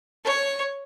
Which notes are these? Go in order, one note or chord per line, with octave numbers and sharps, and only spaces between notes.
C#5